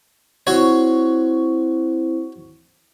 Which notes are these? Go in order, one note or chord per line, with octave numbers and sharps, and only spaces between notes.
C4 E4 F#4 C5 C#5